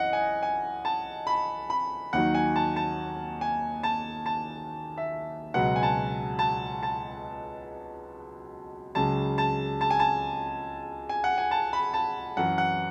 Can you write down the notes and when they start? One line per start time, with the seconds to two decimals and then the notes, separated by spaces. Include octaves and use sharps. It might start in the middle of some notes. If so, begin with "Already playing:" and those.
Already playing: F#2 E3 D#5 F#5
0.13 G#5
0.43 G#5
0.85 A5
1.27 B5
1.70 B5
2.13 D#2 D#3 F#3 F#5
2.34 G#5
2.56 A5
2.76 A5
3.41 G#5
3.83 A5
4.26 A5
4.98 E5
5.54 C#2 B2 F#3 F#5
5.76 G#5
5.83 A5
6.39 A5
6.83 A5
8.95 C#2 C#3 F#3 A5
9.38 A5
9.81 A5
9.90 G#5
10.00 A5
11.09 G#5
11.24 F#5
11.38 G#5
11.51 A5
11.73 B5
11.94 A5
12.37 F#2 E3 F#5
12.58 F#5